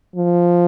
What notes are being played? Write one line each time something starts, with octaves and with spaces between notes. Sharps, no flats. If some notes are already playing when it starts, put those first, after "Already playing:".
F3